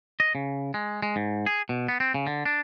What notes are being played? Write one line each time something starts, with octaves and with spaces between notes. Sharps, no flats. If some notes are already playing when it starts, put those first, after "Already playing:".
D#5
C#3
G#3
G#3
G#2
G#4
B2
B3
C4
C#3
D3
D4